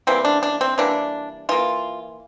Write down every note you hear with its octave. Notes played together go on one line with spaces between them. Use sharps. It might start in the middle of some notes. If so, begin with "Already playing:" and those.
E3 G3 A#3 C4
D4
D4
C4
E3 G3 A#3 D4
E3 A#3 F4